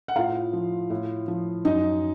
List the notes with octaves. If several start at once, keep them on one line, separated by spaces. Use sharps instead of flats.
F#5
A2 F4 F5
F3
A2
F3
F#2 D#4 D#5